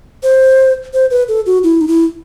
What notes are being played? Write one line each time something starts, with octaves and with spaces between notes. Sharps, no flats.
C5
C5
B4
A4
F#4
E4
D#4
E4